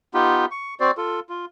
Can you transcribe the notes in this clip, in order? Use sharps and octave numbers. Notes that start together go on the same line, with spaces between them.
B3 D#4 F4 G4
C#6
C4 F#4 C5 D5
F4 A4
F4